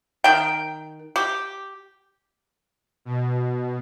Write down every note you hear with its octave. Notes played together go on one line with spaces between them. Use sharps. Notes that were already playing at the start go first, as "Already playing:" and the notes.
D#3 G5
G4
B2